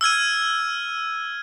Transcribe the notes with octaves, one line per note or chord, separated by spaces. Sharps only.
E6 F6 G#6 D#7